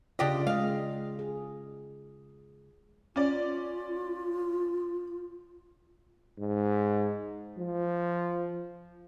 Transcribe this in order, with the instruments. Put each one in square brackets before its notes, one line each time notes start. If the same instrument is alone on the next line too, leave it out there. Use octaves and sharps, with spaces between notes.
[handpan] C#3 F4 [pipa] D4 G4 D#5
[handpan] G#3 D#5 [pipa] F5
[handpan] G#4
[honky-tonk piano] C#4 D5 [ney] F4
[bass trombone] G#2
F3